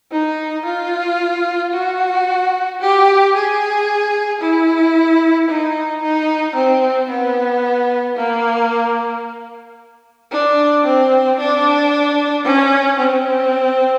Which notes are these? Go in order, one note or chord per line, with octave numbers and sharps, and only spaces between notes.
D#4
F4
F#4
G4
G#4
E4
D#4
D#4
C4
B3
A#3
D4
C4
D4
C#4
C4